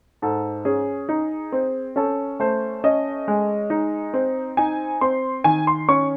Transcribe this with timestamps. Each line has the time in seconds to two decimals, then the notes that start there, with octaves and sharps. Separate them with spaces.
0.22 G#2 A4
0.65 C#4 G#4
1.09 D#4
1.52 C4
1.96 C#4 A4
2.40 A3 C5
2.84 C#4 D#5
3.28 G#3
3.70 D#4
4.14 C4
4.57 D#4 G#5
5.01 C4 C6
5.44 D#3 G#5
5.67 C6
5.89 C#4 C#6